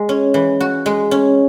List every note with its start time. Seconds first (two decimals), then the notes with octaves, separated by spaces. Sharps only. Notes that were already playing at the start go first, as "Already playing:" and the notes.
Already playing: G#3
0.09 C#4
0.34 E3
0.60 F#4
0.86 G#3
1.11 C#4